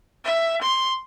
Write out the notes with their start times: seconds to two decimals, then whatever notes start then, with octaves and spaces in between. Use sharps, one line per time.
0.25 E5
0.61 C6